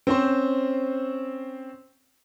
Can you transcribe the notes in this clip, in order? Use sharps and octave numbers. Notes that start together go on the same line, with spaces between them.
C4 C#4 C5